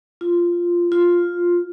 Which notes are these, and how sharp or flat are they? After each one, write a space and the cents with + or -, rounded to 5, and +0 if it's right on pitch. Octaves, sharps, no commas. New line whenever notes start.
F4 -5
F4 +5